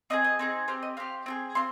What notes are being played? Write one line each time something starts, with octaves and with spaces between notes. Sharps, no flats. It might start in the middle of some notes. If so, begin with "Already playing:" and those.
C4 D#4 G#4 D#5
D#5
C4 D#4 G#4
C4 G4 F5
D#5
C4 G4 F5
C4 F4 G#4
C4 F4 C6